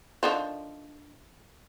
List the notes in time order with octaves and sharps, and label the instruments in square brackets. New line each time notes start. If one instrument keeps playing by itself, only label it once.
[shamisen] D3 D#3 F3